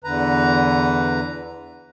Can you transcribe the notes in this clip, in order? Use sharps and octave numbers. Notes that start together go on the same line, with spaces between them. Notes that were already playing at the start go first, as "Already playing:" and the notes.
E2 D3 B4 A#5